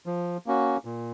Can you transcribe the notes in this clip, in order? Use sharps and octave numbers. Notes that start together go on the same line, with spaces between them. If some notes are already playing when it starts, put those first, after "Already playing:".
F3
A#3 C#4 F#4
A#2